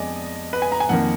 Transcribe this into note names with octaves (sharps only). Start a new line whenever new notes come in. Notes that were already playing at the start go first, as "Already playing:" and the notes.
Already playing: F2 G#3 B3 D5 D#5 G#5
B4
G#5
A#5
G#5
F2 D#3 A#3 F#5